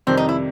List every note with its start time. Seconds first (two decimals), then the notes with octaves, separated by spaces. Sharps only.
0.07 F2 C3 D#3 G3 C4
0.17 D#4
0.29 E4